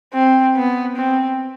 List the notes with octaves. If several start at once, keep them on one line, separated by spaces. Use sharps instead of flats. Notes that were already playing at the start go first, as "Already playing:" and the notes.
C4
B3
C4